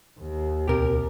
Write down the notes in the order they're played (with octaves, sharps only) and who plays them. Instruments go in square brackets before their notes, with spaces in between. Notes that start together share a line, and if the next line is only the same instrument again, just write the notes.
[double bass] D#2
[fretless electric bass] C#2 B2 C4 [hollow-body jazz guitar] G4 A#4